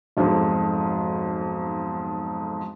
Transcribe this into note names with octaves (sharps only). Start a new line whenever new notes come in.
B1 F2 G#2